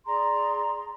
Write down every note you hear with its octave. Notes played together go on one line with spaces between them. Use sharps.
G#4 D5 A#5 C6